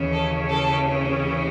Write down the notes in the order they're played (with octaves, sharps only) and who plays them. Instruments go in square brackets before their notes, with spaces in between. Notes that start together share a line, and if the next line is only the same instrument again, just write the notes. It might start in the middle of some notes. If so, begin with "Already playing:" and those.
Already playing: [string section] D#2 C#3 E3
A4
A4